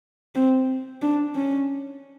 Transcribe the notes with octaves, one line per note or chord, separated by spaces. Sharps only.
C4
D4
C#4